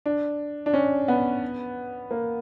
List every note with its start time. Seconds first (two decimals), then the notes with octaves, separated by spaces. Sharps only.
0.06 D4
0.66 D4
0.74 C#4
1.08 B3
2.11 A#3